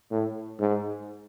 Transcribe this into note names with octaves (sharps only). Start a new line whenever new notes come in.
A2
G#2